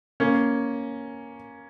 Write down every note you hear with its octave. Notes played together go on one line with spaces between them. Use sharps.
A#3 C#4